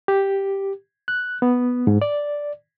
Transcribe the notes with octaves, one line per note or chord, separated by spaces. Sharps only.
G4
F#6
B3
G#2
D5